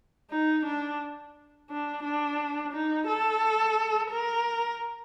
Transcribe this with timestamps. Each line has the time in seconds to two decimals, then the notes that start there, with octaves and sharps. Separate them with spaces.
0.30 D#4
0.66 D4
1.70 D4
2.04 D4
2.73 D#4
3.07 A4
4.10 A#4